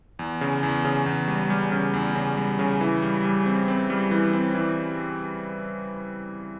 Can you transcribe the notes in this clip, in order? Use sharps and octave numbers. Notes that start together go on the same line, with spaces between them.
E2
C#3
E2
C#3
E2
G3
G3
C#3
E2
C#3
G3
C#3
E3
G3
G3
C4
C4
G3
E3
C4
E3